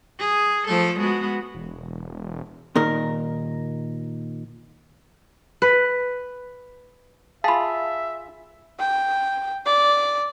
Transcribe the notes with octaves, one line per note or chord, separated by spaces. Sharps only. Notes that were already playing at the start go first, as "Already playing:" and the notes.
G#4
F3 A3 A4
G#3 B3 F#4
E1
A#2 D#3 A#4
B4
F4 G#4 E5 F5 A5 B5
G5
D5